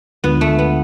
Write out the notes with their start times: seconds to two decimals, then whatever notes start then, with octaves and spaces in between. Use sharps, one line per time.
0.24 D2 D3 G#3 B3 D4 F4
0.41 A3
0.59 B3